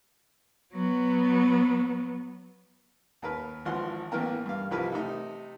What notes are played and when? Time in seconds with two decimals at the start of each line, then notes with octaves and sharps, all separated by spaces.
0.73 F#3 B3
3.22 D#2 A#4 B4
3.65 G#1 E3 F3 F#5 C6
4.11 A1 E3 A#3 B3 A#4 G5
4.46 G2 F5
4.71 C2 C3 E3 F3 A#4 B4
4.92 C3 A3 D#4